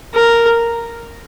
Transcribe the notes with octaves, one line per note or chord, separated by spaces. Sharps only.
A#4